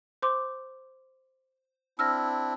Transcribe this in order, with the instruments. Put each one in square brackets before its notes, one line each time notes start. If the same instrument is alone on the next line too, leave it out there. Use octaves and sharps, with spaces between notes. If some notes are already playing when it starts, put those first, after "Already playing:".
[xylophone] C5 C6 D6
[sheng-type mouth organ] C4 D4 E4 [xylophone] E6 F6 A#6